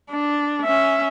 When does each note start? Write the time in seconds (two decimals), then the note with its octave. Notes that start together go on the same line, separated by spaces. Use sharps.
0.11 D4
0.64 C#4 E5